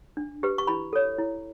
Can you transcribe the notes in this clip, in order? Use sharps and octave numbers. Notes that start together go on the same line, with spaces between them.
D4
G4 B4
C#6
E4 B5
A4 C#5
E4